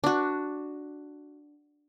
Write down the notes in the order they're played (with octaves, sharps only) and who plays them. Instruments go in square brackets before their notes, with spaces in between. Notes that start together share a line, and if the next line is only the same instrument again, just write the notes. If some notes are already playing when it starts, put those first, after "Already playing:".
[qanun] D4 F#4